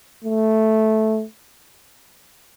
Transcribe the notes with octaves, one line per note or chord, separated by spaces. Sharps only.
A3